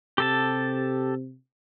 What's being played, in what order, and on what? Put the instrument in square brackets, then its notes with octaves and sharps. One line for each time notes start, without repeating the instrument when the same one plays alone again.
[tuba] C3 [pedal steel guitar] G4 A4 A5